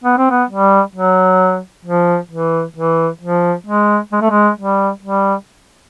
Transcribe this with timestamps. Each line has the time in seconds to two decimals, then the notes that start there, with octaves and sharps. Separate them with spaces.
0.04 B3
0.18 C4
0.31 B3
0.49 G3
0.95 F#3
1.85 F3
2.31 E3
2.76 E3
3.21 F3
3.67 G#3
4.12 G#3
4.21 A3
4.31 G#3
4.58 G3
5.03 G3